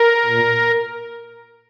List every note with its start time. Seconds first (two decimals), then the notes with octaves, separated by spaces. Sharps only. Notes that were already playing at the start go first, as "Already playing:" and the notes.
Already playing: A#4
0.25 A#2